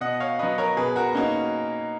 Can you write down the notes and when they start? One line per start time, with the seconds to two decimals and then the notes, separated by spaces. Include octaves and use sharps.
0.01 B2 D#5 F#5
0.20 C#5 F5
0.39 F#3 B3 B4 D#5
0.58 A#4 C#5
0.77 B2 G#4 B4
0.96 F#4 A#4
1.14 A#3 C#4 D#4 F#4